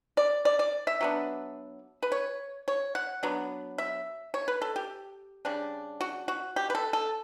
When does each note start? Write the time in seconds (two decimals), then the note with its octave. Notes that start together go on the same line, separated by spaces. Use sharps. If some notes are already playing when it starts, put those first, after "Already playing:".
0.17 D5
0.45 D5
0.59 D5
0.87 E5
1.01 F#3 B3 D4
2.03 B4
2.12 C#5
2.68 C#5
2.95 F#5
3.23 F#3 B3 D4
3.78 E5
4.34 C#5
4.48 B4
4.62 A4
4.76 G4
5.45 C#3 G3 D4
6.01 F#4
6.28 F#4
6.56 G4
6.70 B4
6.75 A4
6.93 A4